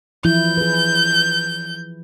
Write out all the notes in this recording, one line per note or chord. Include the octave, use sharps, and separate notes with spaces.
E3 F3 E4 G6
G#4 B4